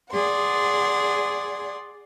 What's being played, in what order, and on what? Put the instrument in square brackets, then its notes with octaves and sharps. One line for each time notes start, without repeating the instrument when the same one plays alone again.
[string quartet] G#4 D5 F#5 C6